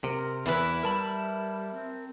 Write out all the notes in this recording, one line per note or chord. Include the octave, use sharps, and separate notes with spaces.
C3 A#4
E2 E3 E4 B4
G3 A#4 A5 B5
C4